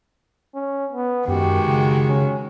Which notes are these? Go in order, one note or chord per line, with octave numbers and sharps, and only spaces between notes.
C#4
B3
F#2 D#3 G#3 F#4 G4
C#3
C#4